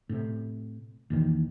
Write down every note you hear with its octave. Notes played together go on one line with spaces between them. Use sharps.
A2 C3
A#1 E2 D#3